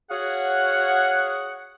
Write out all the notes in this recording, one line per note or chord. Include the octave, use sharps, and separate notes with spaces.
F#4 G#4 C#5 F5 F#5